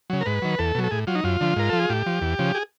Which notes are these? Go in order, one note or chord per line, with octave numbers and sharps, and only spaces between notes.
C#3 F#3
A#4
G#2 B4
D#3 F#3
E2 A4
B2 F#3
A4
A2 G#4
F#3 F4
D#4
F#2 F4
D3 F3
G#2 A#4
F3 A4
G#4
A2 G4
F3
E2
C#3 F3
G#4